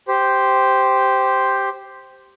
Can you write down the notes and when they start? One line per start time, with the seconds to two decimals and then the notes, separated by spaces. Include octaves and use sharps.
0.08 G4 C5